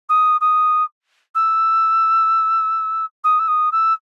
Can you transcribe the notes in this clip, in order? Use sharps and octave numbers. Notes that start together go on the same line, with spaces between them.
D#6
D#6
E6
D#6
E6
D#6
E6